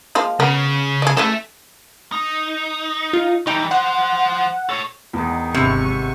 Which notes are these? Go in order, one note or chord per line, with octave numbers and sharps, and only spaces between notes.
F3 G#3 A#3
C#3 B3 A#4
G#4 D#5
E3 G#3 C#4 A4 E5
D#4
F4
E3 G3 D#4 G5
F3 C5 F#5
A4 C#5
E2 D#3 G#3 B3
G#1 C3 B4 E5 C#6